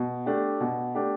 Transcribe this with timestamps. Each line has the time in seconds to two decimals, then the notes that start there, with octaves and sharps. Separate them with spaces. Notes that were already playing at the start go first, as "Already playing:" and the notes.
Already playing: B2
0.26 A3 D4 G4
0.60 B2
0.95 A3 D4 G4